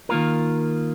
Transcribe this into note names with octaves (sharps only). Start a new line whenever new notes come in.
D#3 A#3 F4 A#4